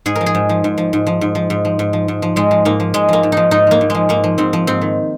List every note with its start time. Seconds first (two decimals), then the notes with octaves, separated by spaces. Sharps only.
0.06 G#2 G#4
0.15 A#4
0.21 F3
0.26 G#4
0.35 G#2
0.49 F3
0.64 G#2
0.78 F3
0.93 G#2
1.07 F3
1.21 G#2
1.35 F3
1.50 G#2
1.65 F3
1.79 G#2
1.93 F3
2.08 G#2
2.22 F3
2.36 G#2 G#3
2.51 F3
2.65 G#2 A#3
2.80 F3
2.94 G#2 G#3
3.08 F3 A#3
3.23 G#2
3.32 F3 D#4
3.51 G#2 D#4
3.67 F3 A#3
3.81 G#2
3.90 F3 G#3
4.09 G#2 A#3
4.24 F3
4.38 G#2 C4
4.53 F3
4.67 G#2 C4
4.81 D#3